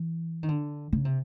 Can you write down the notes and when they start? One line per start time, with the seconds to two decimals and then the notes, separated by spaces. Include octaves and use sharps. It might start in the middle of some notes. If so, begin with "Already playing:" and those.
Already playing: E3
0.43 D#3
0.49 D3
0.92 C#3
1.05 C3